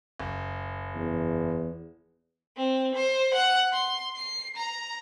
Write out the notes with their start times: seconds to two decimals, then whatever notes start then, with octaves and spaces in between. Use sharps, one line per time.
0.20 F#1
0.95 E2
2.57 C4
2.95 C5
3.34 F#5
3.73 C6
4.16 C7
4.56 A#5